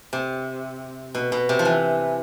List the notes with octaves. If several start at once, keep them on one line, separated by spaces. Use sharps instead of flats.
C3
B2
B2
C3
F3
E3